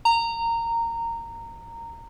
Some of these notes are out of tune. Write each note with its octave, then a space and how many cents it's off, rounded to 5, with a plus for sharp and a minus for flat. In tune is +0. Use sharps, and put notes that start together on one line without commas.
A#5 -15